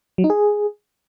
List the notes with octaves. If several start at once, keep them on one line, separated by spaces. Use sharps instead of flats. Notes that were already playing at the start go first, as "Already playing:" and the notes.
F#3
D#4
G#4